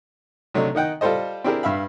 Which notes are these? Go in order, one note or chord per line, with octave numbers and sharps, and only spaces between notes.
C3 F#3 A3 D4 D#4
D#3 D#4 F#5 G5
G3 F4 A4 C5 D#5
C4 D4 E4 G4 G#4 A#4
G2 E5 F5 B5